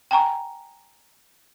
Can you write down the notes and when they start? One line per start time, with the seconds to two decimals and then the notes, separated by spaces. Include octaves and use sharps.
0.11 G5 G#5 A#5 C#6